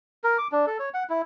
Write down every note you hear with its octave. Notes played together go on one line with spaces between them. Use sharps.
A#4
D6
D4
A4
C#5
F#5
E4